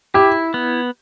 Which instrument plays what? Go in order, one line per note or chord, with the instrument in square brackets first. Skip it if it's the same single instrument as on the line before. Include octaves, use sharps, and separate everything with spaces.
[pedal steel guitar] E4 [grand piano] G4
[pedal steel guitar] B3